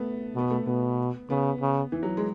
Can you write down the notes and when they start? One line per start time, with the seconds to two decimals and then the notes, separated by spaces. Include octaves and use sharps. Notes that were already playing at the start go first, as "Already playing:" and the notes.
Already playing: A3 B3
0.35 B2 B3
0.50 A3
0.66 B2 B3
1.30 C#3 B3
1.61 C#3
1.92 E3
2.03 F#3
2.17 G#3